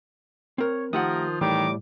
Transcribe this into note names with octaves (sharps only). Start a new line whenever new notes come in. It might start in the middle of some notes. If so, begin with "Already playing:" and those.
C4 A#4 C#5
D#3 F3 A3 G4 A#4 F#5 D#6
A2 D#3 E3 G3 D6